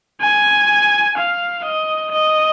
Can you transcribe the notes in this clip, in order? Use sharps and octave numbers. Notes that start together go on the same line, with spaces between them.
G#5
F5
D#5
D#5